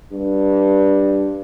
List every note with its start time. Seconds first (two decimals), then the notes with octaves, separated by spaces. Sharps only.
0.12 G2